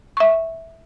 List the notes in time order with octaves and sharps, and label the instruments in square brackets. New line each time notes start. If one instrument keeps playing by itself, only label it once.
[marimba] E5 C#6